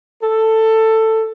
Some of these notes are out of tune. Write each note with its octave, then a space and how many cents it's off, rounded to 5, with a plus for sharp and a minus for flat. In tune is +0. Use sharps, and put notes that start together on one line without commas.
A4 +10